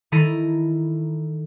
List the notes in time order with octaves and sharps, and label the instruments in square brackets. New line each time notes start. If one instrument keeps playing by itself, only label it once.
[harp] D#3 E4 A4 A#5 B6 D#7